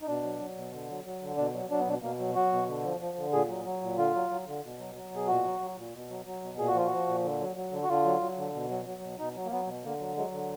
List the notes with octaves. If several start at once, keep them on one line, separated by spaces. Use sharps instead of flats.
D#4
B2 D4
F#3
F#3
B2
D3
F#3
F#3
D3
B2 D4
F#3
F#3 D4
B3
B2 D4
B2 A#3
F#3
F#3 F#4
B2
D3
F3
F3
D3
A#2 G#4
F#3
F#3
A#2
D3 F4
F#3
F#3
D3
B2
F#3
F#3
B2 G#4
A#2 F#4
F#3
F#3
A#2
B2
F#3
F#3
B2
A#2 G#4
F#4
F3 F4
F3 F#4
A#2
D3
F#3
F#3
D3
F#4
D3 F4
F#3
F#3
D3
B2
F#3
F#3
B2
B2 D#4
F#3
A#3
F#3 B3
B2
D3 A#3
F#3
F#3 G#3
D3